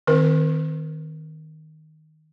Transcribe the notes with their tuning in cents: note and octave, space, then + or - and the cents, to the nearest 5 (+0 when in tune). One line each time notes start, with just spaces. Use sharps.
D#3 +0 C4 +0 A#4 +0